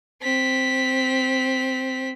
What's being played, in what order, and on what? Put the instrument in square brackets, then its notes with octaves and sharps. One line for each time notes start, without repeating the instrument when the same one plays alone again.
[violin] C4 B6